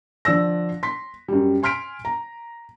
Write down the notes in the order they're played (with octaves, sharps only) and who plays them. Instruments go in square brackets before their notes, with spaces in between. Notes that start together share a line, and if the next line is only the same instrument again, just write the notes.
[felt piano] D3 F3 D5 E6 A#6
C6 B6
F#2 G3
G#5 C6 F6 B6 D7
A#5